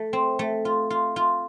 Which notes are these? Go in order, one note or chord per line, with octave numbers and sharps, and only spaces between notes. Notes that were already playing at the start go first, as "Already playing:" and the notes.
Already playing: A3
C4
A3
F4
F4
F4